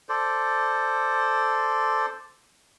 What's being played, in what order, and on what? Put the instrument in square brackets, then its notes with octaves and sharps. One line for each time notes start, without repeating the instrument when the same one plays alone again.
[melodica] A4 C5 D5